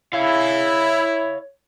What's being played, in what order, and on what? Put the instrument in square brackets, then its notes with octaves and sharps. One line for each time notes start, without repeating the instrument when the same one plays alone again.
[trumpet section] E4 [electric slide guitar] C#5 F5